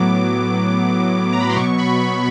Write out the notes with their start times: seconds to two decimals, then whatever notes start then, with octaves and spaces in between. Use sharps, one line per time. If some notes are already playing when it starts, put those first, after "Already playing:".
Already playing: A2 F#3 B3 D6
1.33 A#5
1.40 B5
1.49 C6
1.56 B2 F#3 B3 C#6
1.78 B5
2.01 B5